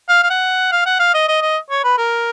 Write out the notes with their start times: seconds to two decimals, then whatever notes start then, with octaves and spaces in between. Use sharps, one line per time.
0.09 F5
0.23 F5
0.30 F#5
0.72 F5
0.86 F#5
1.00 F5
1.14 D#5
1.28 D#5
1.42 D#5
1.70 C#5
1.84 B4
1.98 A#4